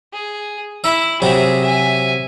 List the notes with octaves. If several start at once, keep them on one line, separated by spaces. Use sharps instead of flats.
G#4
E4 E5
C3 F#3 G#4 E5
E5 G#5